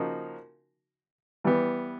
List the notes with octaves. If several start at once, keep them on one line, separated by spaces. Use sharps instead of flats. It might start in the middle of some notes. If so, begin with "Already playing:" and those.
Already playing: C#3 F3 A#3 D#4 F#4
E3 G3 B3